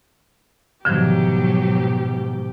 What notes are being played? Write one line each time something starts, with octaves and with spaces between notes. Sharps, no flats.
G#2 B2 D3 D#3 F3 F#3 G4